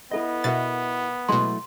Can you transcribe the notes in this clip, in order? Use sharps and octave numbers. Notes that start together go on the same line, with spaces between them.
B3 E4 A4 D#5 E5
B2 A#4 E5 F#5 A6
B2 F#3 G#3 A3 E4 C6